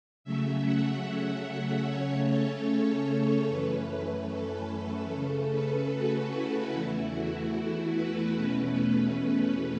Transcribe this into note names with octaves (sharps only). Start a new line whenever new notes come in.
C#3 F#3 A3 C#4 E5
F#5
E5
C#3 A3 C#4 C#5
A4
F#2 E3 A3 C#4 B4
A4
A4
C#3 A3 C#4
B4
F#4
E4
E2 E3 A3 E4
F#4
B4
E2 B2 A3 C#4